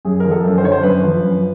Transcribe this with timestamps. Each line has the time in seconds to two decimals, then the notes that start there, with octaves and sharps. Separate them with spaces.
0.05 F#2 G#4
0.20 F3 A#4
0.31 A4
0.45 F#2
0.58 C5
0.63 D3 C#5
0.72 C5
0.83 F#2 B4
1.03 F3
1.23 F#2